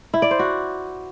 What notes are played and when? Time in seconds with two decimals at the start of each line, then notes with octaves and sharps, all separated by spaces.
0.14 E4
0.22 D5
0.31 C5
0.39 F#4